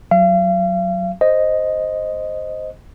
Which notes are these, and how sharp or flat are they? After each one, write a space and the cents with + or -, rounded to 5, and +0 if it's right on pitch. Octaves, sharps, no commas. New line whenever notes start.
F#3 +0 F5 -40
C5 +0 D#5 +0